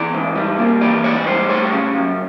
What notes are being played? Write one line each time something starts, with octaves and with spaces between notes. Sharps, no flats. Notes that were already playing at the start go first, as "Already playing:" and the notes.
Already playing: E3 D5
G#2
G3
A#3
E3 D5
G#2 C#5
G3 C5
A3 C#5
C#3
F#2